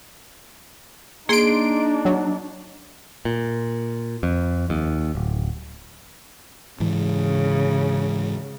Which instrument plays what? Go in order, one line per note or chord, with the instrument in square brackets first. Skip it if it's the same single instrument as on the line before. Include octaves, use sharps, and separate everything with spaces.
[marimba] A#3 G#4 [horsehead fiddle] D4 D#4 [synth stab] C6 D7
[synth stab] F#3
[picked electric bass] A#2
F2
D#2
D1
[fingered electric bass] G#2 E3 [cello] C#3